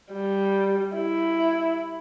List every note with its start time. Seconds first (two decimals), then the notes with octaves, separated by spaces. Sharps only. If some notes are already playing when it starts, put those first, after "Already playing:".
0.13 G3
0.96 E4